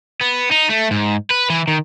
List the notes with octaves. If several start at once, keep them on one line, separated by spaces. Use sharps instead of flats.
B3
D#4
A3
G#2
B4
E3
D#3